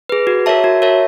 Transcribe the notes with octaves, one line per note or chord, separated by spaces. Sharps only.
G#4 B4
F#4
A#4 C#5 E5 A5
F#4
A#4 C#5 E5 A5